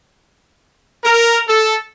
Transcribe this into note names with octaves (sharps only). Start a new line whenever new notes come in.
A#4
A4